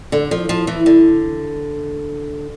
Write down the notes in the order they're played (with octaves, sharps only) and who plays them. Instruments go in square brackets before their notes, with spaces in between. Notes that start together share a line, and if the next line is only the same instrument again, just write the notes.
[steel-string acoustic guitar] D3
F3
F3
E3
D3